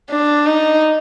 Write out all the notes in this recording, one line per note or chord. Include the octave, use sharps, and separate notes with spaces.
D4
D#4